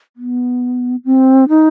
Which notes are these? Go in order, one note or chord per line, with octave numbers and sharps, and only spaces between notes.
B3
C4
D#4